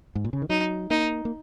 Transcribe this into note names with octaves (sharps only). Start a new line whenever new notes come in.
G#2
A#2
C#3
D#3
F#3 D#4
A#3 D#4
A#3